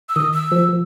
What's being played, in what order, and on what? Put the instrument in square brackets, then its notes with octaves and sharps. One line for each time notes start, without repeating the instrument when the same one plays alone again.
[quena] E6
[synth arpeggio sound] D#3 [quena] D#6
[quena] E6
[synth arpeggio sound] F3
F3